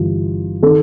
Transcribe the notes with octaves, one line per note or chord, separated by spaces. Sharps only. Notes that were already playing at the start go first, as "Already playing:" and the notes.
Already playing: G1 G2 E3 F4
D#3 A4